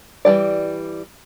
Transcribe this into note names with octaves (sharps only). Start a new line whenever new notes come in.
E3 F3 G3 D5